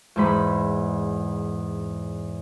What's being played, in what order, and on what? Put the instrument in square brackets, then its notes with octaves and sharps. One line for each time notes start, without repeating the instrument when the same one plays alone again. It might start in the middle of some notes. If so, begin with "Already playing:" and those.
[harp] E2 G#2 B5